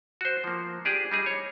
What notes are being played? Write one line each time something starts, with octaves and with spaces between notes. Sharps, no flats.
F#4 C5
F3 A#3
D4 G4 G#4 D5
G3 D#4 G#4
C#5